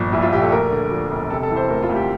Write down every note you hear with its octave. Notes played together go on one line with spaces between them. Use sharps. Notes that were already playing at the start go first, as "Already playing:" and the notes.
Already playing: G1 A#2 F3
A#1 E4
F4
A#1 G4
A4
D2 A#4
D3
F3
E1
C3 A4
A4
E3
C5
D2 A#4
F4
D2
G4